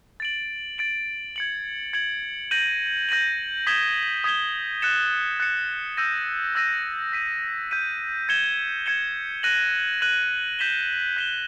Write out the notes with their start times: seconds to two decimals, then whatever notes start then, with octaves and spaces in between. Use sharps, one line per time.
0.20 A6 D7 F#7
0.78 A6 D7 F#7
1.36 G#6 C#7 F#7
1.93 G#6 C#7 F#7
2.51 G6 A#6 D#7 F#7
3.09 G6 A#6 D#7 F#7
3.67 D#6 G#6 B6 E7 G7
4.24 D#6 G#6 B6 E7 G7
4.82 F#6 A6 C#7 E7
5.40 F#6 A6 C#7 E7
5.97 E6 G6 A#6 D#7
6.55 E6 G6 A#6 D#7
7.12 G6 B6 D#7
7.71 G6 B6 D#7
8.29 G#6 C#7 E7 G7
8.86 G#6 C#7 E7 G7
9.43 F#6 A#6 D#7 F#7
10.01 F#6 A#6 D#7 F#7
10.59 G6 B6 E7 G7
11.17 G6 B6 E7 G7